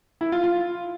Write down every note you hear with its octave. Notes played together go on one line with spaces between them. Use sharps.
E4
F4
F4